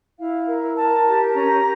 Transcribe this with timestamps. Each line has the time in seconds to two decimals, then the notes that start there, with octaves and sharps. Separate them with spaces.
0.19 E4 F5
0.48 A#4
0.77 A#4 A5
1.06 G4
1.34 C#4 A#5